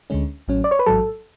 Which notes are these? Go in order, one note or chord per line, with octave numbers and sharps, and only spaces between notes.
D2 D3 G#3 C#4
A1 A2 F#3 C#4
D5
C#5
B4
A1 G#2 F#3 A4